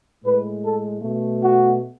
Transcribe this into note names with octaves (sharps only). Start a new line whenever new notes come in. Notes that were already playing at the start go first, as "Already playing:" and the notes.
A2 G#3 B4
A4
B2 A3
F#4